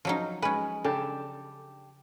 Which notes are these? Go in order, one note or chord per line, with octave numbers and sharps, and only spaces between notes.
F3 F#3 C#4 D#4
G#3 C#4 B4
C#3 D4 G4 A4